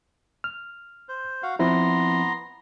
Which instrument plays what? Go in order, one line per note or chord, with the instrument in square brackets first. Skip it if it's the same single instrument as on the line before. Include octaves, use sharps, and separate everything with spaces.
[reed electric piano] F6
[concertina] C5
F#4 F5 F#5
[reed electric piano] F3 C4 E4 [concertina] B3 A#5 C6